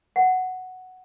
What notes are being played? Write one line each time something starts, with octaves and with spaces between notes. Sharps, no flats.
F#5